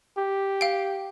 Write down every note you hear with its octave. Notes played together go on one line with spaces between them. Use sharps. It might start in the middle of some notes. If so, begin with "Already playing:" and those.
G4
F5 G5